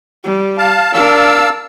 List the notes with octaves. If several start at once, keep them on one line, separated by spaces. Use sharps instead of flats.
G3
F5 A5
D4 A#4 F5 A5 E6